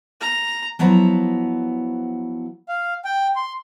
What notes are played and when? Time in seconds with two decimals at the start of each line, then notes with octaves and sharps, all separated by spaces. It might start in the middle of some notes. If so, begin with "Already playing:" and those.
0.21 A#5
0.79 F3 F#3 B3 E4 B4 A#5
2.69 F5
3.05 G5
3.36 C6